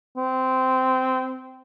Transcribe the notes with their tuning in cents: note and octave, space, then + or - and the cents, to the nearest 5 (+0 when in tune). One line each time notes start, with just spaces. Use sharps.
C4 -15